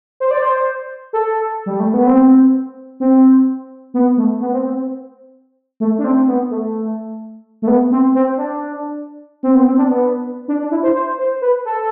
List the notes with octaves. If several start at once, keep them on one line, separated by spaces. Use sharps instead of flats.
C5
D5
C5
A4
G3
A3
B3
C4
C4
B3
A3
B3
C4
C4
A3
D4
C4
B3
A3
A3
B3
C4
C4
D4
C4
B3
C4
D4
B3
D4
D4
E4
C5
C5
C5
B4
A4